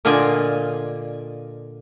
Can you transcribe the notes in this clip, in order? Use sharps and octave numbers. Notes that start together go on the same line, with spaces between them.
A#2 D3 F4 D5 D#5 G#5